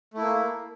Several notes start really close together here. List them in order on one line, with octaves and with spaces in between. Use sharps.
A3 E4 A#3